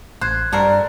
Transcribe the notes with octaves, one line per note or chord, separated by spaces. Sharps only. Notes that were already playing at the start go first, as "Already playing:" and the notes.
A1 C5 F#6 G#6
G2 A3 C4 A#4 D5